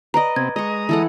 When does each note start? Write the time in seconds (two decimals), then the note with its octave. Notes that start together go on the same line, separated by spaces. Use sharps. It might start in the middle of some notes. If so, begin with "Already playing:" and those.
0.14 B4 D5 D#5 A#5
0.36 C3 B3 C4 G#6
0.56 G#3 D#5 A#5 C#6 D#6
0.89 E3 A4 F#5